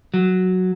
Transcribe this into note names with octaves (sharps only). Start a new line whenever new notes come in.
F#3